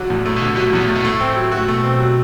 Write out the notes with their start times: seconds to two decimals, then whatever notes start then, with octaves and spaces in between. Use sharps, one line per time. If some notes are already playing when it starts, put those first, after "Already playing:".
Already playing: D3 F#3
0.10 E2 A2
0.25 A2 A3
0.36 B2
0.42 A2 D3
0.56 B2 F#3
0.66 A2
0.73 E2 B2
0.85 A2 A3
0.95 B2
1.05 A2 A3
1.21 C4
1.36 F#3
1.52 F#4
1.57 A2
1.68 B2 A3
1.84 C4
2.00 F#3